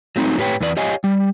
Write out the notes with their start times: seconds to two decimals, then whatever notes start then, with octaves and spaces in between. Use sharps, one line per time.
0.16 F#3 A3 C4 D#4
0.38 A2 A3 G4 B4 C#5 G5
0.61 E2 E3 B4 D5
0.77 G4 C#5 D#5 F5 G#5
1.04 G3